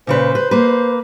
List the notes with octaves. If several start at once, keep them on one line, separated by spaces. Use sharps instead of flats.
A#2 C#3 B4 C5
B4
A#3 B4